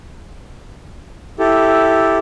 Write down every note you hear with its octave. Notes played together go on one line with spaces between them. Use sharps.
E4 G4 A4